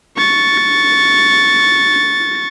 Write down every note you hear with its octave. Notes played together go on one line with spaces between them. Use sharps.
C#6 A6